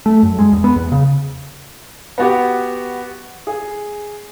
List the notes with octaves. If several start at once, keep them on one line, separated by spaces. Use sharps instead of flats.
A3
F#2
G#3
E2
B3
E2
C#3
B3 F#4 G4
G#4